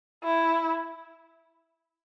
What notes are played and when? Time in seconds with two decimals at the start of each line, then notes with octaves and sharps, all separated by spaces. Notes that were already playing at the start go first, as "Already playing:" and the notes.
0.24 E4